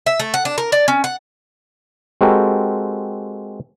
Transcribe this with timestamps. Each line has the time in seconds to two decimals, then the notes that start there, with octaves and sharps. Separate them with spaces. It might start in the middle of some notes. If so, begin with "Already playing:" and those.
0.06 E5
0.20 A3
0.34 F#5
0.45 D4
0.58 A#4
0.72 D5
0.88 C#4
1.04 F#5
2.21 G#3 C4 F#4 G4 A4 A#4